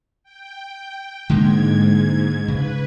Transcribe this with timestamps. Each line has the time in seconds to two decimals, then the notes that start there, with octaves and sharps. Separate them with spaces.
0.23 G5
1.29 G#2 D3 G#3 A#3 G#6
2.48 C#3 B4